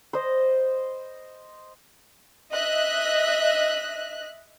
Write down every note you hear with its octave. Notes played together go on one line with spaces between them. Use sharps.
C5 D#5
D#5 E5 F#6